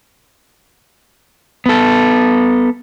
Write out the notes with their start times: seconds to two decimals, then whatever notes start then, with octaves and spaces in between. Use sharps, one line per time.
1.66 B3 A4